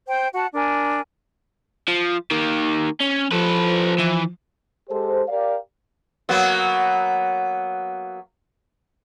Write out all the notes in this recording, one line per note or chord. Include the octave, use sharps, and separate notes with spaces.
C5 G5
F#4 F#5 A5
D4 A#4 G#5
F3
D#3 A#3
C#4
F3 A4 B4
E3
G#3 G4 A4 C5
G4 A#4 D5 F5
F#3 A#3 B3